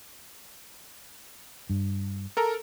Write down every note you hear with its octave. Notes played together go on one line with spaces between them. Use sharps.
G2
A4 A#4 A#5